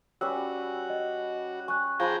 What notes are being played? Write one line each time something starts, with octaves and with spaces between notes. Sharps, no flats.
G3 C#4 F#4 B4 E6
D#5
G#5 C#6 F#6
F3 G#4 G5 A#5 B5